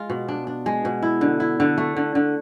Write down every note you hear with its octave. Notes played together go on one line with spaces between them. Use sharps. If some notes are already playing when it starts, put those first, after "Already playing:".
Already playing: G#3 F4
B2
D4
D4
G#3
B2
E4
D3
E4
D3
A3
D3
D3